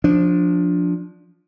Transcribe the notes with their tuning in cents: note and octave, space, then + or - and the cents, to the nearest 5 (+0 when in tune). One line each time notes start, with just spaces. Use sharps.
F3 +15 D4 -5